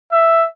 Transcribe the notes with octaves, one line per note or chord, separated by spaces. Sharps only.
E5